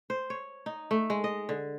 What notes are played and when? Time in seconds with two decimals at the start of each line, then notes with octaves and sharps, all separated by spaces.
0.10 C5
0.30 C#5
0.66 D#4
0.91 A3
1.10 G#3
1.24 D#5
1.49 D3